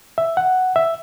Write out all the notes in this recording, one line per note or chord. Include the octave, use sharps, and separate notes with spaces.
E5
F#5
E5